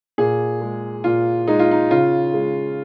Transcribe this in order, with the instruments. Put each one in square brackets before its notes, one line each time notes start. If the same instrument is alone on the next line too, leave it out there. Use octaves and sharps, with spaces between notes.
[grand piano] A#2 G#4
G#3
A#2 F4
G#3 D#4
F4
D#4
C#3 F4
G#3